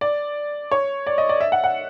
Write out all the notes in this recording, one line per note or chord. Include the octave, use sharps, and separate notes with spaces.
D5
C#5
D5
D#5
D5
E5
F#5
F#5